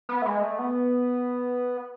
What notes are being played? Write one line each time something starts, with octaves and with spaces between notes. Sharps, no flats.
B3
A3
G#3
A3
B3